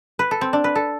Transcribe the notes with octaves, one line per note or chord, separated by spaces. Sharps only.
B4
A4
C4
D4
B4
A4